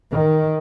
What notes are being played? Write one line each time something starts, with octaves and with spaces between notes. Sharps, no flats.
D#3